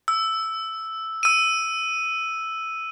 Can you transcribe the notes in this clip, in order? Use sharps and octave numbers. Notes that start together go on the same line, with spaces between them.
E6
E6 D#7